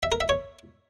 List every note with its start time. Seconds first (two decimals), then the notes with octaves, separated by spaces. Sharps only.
0.03 E5
0.12 A#4
0.20 E5
0.29 C#5